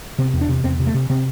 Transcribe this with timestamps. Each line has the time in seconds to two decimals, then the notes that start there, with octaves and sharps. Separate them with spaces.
0.19 C3 C4
0.34 E2
0.41 D4
0.49 C3
0.64 E2 C4
0.79 C3
0.87 A3
0.94 C3
1.10 C3 C4